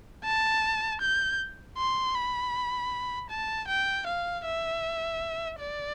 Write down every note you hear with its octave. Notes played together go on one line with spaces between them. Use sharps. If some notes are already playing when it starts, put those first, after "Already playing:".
A5
G6
C6
B5
A5
G5
F5
E5
D5